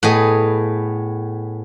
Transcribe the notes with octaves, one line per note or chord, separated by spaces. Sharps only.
A2 B3 G#4 D#5